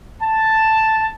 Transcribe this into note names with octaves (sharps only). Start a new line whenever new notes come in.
A5